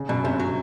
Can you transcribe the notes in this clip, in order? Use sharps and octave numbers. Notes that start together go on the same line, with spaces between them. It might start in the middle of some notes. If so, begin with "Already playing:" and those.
Already playing: C#3
F#2 B2
G1 C3
F#3